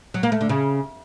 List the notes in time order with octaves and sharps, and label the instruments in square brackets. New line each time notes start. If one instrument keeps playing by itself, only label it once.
[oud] F#3
A#3
A3
D3
C#3